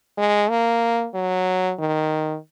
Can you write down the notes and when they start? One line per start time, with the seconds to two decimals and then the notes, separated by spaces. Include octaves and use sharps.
0.18 G#3
0.50 A#3
1.14 F#3
1.79 D#3